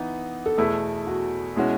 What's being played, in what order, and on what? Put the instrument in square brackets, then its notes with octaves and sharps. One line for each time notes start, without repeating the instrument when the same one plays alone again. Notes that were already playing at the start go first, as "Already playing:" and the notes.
Already playing: [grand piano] E3 B3 D#4
[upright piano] A4
[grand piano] E2 B2 A3 E4 [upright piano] G#4
[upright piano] F#4
[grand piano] B2 G#3 C#4 F#4 [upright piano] E4